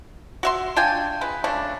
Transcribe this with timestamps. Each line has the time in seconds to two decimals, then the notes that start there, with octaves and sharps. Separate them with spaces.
0.43 F#4 E5 C6
0.76 D4 F4 G5 G#5
1.21 G#3 B4
1.44 C#3 A3 D4